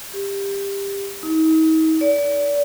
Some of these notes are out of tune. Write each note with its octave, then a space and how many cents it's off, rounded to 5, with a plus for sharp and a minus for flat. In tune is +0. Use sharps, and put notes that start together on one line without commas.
G4 +20
D#4 +40
D5 -35